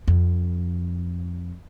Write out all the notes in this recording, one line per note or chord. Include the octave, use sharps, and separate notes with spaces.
F2